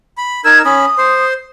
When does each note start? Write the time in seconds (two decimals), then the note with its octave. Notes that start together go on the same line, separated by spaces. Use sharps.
0.18 B5
0.45 D#4 A#4 E6 G#6
0.65 C#4 B5 D#6
0.98 C5 C6